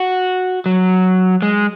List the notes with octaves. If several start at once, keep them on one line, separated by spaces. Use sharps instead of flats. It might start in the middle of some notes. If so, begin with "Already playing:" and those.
Already playing: F#4
F#3
G#3